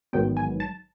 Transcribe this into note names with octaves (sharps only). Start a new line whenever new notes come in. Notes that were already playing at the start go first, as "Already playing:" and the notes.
A1 G#2 D#3 F#3 B3 G5
G#5
A5